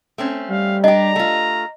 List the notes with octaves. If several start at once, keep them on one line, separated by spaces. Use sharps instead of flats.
A3 C4 C#4
G3 F5
D4 G4 D#5 A#5
A3 F4